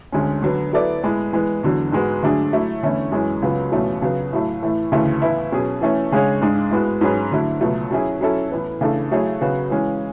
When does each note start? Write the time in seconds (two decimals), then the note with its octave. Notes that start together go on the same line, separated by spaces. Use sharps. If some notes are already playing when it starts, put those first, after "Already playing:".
0.12 D2 D3 G#3 C#4
0.42 D3 F#3 B3
0.72 F#3 B3 E4 A4 D5
1.03 A2 G#3 B3
1.33 E3 G#3 B3
1.63 E2 D3 F#3
1.92 G#2 G#3 B3 F#4
2.23 D3 F#3 A3 D4 G#4
2.53 F#3 A3 E4
2.82 E2 D3 A3 C#4 E4
3.12 F#2 E3 G#3 C#4
3.42 C#2 C#3 F#3 B3 F#4
3.72 E2 B2 F#3 A3 C#4
4.02 C#3 F#3 B3
4.33 A2 F#3 A3
4.63 A2 E3 A3
4.92 D2 C#3 E3 A3
5.22 A2 E3 B3 E4
5.52 B2 F#3 C#4 G#4
5.81 E3 A3 C#4
6.12 C#3 G#3 D4 G#4 C#5
6.41 G#2 G#3 D4
6.71 A2 G#3 B3 F#4
7.01 G#2 F#3 C#4 G#4 B4
7.32 D3 F#3 A3 E4
7.61 C#2 B2 F#3 A3
7.91 F#3 C#4 E4 G#4
8.21 F#3 C#4 E4 A4
8.51 A2 E3 B3
8.81 C#3 E3 A3 D4 A4
9.11 F#3 A3 E4 G#4 C#5
9.41 C#3 F#3 B3 F#4
9.70 E3 G#3 C#4